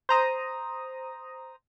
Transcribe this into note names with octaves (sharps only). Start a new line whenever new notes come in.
C5 A#5 D#6